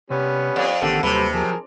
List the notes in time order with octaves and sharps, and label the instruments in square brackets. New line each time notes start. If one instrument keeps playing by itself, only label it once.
[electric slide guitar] C3 [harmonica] G3 B3 C#4
[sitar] F2 [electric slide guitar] D5
[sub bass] A1 [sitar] D3 [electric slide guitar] D#3 B3 A#4 [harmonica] G4 A4
[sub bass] D#2 [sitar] C3 [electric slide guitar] F#3 G3 C5 [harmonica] A4 B4
[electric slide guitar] F3 F#3 [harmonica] G#4 A#4 A5